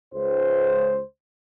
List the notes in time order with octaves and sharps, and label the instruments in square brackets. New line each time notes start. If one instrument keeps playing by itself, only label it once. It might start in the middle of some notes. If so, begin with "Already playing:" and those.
[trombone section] C#2 C5